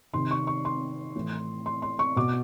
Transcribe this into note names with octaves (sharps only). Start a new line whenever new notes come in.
C3 D#3 C6
C#6
C#6
C6
A2 E3
C6
C6
C#6
B2 D6